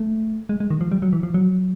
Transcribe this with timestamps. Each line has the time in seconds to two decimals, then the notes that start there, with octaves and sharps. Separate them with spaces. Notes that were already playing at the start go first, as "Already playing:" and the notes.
Already playing: A3
0.49 G#3
0.60 G#3
0.70 D#3
0.81 F3
0.92 G3
1.02 F#3
1.13 E3
1.23 F3
1.34 F#3